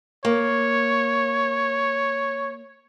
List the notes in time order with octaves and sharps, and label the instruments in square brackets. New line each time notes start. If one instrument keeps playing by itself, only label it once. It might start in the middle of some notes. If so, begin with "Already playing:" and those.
[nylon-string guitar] A#3 [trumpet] C#5